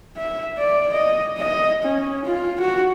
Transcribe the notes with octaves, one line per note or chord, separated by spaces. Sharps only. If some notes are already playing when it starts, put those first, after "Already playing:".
E5
D5
D#5
D#5
C#4
F4
F#4